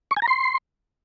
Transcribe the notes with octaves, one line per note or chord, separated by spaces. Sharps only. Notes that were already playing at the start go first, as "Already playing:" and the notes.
C#6
G#5
A#5
C6